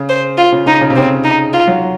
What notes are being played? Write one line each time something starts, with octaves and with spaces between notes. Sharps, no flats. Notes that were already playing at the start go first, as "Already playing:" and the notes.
Already playing: C#3
C5
F4
C#3
C#3 D#4
C#3
C3
C#3 C4
D#4
F4
F#3